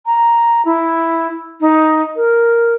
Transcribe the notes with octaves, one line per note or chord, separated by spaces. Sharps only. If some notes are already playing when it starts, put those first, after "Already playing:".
A#5
E4
D#4
A#4